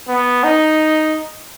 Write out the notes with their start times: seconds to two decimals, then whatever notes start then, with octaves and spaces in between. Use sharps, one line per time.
0.09 B3
0.44 D#4